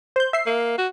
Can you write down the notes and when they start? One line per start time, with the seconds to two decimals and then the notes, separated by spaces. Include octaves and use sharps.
0.16 C5 G6
0.33 E5 C7
0.46 A#3
0.78 F#4